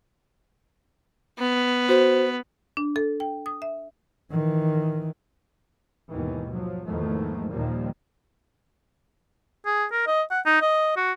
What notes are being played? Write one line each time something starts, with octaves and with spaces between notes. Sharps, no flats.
B3
F#4 C5
D4
A4
G5
D#6
E5
D#3 E3
D#2 G#2 B2 D#3 E3
F3 F#3
E2 G#2 D#3 F3 A3 A#3
D#2 A#2 D#3 F3 G3 A#3
G#4
A#4
D#5
F#5
D#4
D#5
F#4